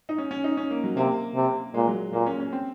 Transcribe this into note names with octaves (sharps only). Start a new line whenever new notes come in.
D#4
C#4
C#4
D#4
C#4
A#3
F#3
C3 A#3
C3
A#2 G#3
F#3
A#2 A#3
C#4
C#4
C4